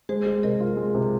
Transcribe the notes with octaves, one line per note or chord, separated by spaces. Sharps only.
G#3 G#4 C5
G#3
C3 A#4 D#5
F4
G#3
C3